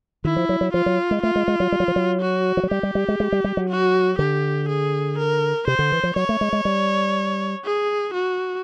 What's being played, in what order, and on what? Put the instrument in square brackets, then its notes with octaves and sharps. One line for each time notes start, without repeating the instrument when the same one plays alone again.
[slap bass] D#3 [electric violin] E4
[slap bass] F3
F#3
F#3
[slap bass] F3 [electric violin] F4
[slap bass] F#3
G#3
[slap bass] A3 [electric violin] F4
[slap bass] G#3
G#3
F#3
G3
F#3
F3
F#3
[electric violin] F#4
[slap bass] F3
F#3
[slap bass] G3 [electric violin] G4
[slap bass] G3
G3
G#3
G#3
G3
G3
F#3
[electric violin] F#4
[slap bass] D3 [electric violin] G4
[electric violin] G#4
A#4
[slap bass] C3 [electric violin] C5
[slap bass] D3
E3
F3
[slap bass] F#3 [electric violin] C#5
[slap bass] A3
G#3
G#3
G3
[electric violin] G#4
F#4